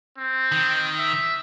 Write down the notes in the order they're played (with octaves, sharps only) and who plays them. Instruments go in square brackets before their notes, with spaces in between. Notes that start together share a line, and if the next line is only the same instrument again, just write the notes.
[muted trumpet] C4
[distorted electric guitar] D#3
[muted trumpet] E5